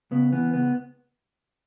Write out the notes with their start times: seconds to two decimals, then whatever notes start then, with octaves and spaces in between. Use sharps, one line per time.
0.12 C#3 B3
0.32 E3 B3
0.53 C#2 B3